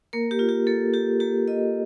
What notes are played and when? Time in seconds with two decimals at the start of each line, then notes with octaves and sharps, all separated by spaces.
0.13 A#3 A#4
0.31 G4
0.39 F4
0.49 G4
0.67 A#3 A4
0.94 F4 G4
1.20 A#3 G4
1.48 F4 D#5